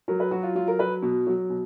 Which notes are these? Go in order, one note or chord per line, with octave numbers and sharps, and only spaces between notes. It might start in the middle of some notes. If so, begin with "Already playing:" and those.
F#3 A#4
B4
F#3 F#4
F4
F#3 F4
A#4
F#3 B4
B2
F#3
B2